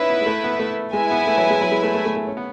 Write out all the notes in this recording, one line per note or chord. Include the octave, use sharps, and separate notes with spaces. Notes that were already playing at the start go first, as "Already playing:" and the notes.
Already playing: C#4 D#4 E4 B4 E5
B3
G#3
A3
B3
A3
G#3 E4 B4 E5 G#5
B3
A3
F#3
G#3
F#3
G#3
A3
A3
A3
A3
C#4
B3